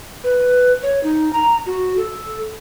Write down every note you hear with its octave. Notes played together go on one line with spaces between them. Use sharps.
B4
C#5
D#4
A#5
F#4
A4